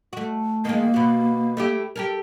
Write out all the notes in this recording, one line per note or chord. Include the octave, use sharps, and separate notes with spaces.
A3 F#4
D#3 G#3 A#3
B2 F#4
A3 E4 G4
G4 A4 A#4